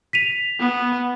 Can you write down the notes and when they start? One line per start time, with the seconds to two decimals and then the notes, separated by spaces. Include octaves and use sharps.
0.13 B6 D#7 F7
0.59 B3